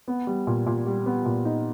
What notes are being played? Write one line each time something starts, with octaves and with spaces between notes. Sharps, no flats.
B3
G3
A#2
A#2
G3
B3
A#2
D#4